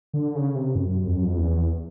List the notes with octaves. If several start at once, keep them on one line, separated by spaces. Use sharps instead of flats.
D3
C#3
C3
F#2
F2
F#2
F2
E2